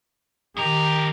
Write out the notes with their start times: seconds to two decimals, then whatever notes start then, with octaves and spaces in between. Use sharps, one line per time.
0.57 F2 D#3 G4 A#4